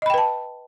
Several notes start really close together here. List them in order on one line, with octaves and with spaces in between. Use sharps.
D#5 B5 G5 B4 A5